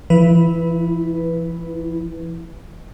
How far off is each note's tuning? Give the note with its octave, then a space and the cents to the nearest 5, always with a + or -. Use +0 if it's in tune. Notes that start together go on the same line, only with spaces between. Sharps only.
E3 +45 E4 -15 B4 +0